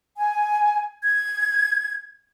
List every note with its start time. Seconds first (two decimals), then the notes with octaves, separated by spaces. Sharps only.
0.17 G#5
1.03 G#6